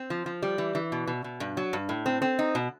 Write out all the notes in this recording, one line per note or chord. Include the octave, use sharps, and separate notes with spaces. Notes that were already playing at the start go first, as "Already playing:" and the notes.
Already playing: C4
F3
F3
G3
E3
E3
B2
B2
B2
G2
F#3
G2
A2
C4
C4
D#4
B2